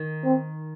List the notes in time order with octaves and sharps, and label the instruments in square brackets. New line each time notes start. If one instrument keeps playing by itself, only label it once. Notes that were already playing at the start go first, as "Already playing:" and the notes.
Already playing: [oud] D#3
[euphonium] C4